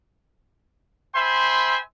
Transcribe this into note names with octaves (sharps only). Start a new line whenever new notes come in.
C5 E5 G5 G#5 B5 C6